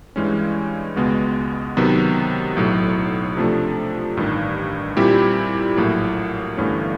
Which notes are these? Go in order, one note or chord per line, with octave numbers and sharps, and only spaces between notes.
G2 E3 G#3 C#4
C#2 B2 G#3 B3
C3 D#3 F#3 B3
B1 A2 F#3
C3 F3 A3 D4
A1 G2 D#3
A#2 G3 C4 E4 G4
A#1 A2 F#3 A#3
G1 G2 E3 A3 C#4